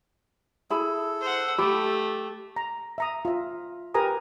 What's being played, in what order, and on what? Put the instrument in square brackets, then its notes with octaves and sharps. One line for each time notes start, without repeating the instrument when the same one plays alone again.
[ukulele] E4 G#4 B5 [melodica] A4
[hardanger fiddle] C5 F#5
[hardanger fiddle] A3 [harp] G4 [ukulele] B5
[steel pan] A#5
E5 A#5 D#6
F4 E5
G4 A#4 B4 G#5 A#5 D#6